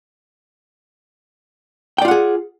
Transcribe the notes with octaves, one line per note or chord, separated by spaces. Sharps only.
F4 G#4 D5 F#5 G5